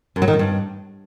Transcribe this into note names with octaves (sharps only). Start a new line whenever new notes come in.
F#2
F#3
D#3
F#2
G2